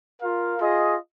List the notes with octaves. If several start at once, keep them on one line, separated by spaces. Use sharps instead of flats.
F4 A#4 F5
F4 G#4 D#5